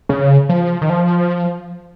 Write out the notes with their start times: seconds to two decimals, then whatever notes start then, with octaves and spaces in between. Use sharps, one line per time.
0.09 C#3
0.49 F3
0.81 D#3
0.90 F3